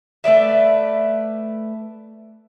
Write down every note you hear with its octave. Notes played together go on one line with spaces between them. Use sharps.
A3 B4 D5 E5